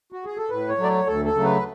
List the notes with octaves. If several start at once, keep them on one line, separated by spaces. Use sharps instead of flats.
F#4
G#4
A4
A2 B4
C#5
F#3 A3
D5
C#5
D2 A4
A4
C#3 F#3 A3
B4